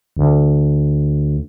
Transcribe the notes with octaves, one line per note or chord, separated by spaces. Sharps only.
D2